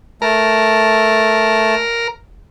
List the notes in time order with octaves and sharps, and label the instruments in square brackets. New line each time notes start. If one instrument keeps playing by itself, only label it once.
[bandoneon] A3 A5 [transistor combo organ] A#4